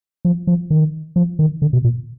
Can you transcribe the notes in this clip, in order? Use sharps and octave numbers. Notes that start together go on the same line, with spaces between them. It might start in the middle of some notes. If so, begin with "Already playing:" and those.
F3
F3
D#3
F3
D#3
D3
B2
A#2